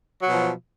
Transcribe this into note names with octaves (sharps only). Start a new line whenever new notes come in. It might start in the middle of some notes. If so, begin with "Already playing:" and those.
B2 F3 F#3